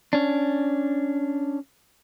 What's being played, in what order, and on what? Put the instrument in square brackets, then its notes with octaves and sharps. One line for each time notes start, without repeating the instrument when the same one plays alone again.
[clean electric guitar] C#4 D4